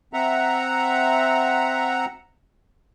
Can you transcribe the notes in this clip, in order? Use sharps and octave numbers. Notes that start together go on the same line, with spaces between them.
C4 E5 F#5 A#5